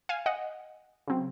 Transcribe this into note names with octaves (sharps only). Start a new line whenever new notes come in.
F5 G#5
D#5 F#5
C#3 F#3 C4